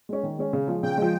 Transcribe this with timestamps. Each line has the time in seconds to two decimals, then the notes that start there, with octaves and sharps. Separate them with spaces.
0.09 G#3 C#4
0.23 D#3
0.38 G#3 C#4
0.53 C#3
0.68 F3 G#3
0.83 C#3 G5
0.98 F3 G#3